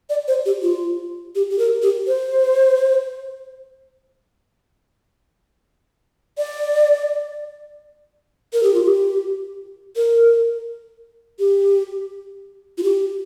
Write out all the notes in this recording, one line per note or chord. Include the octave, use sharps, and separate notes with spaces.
D5
C5
G4
F4
G4
G4
A#4
G4
C5
D5
A#4
G4
F4
G4
A#4
G4
F4
G4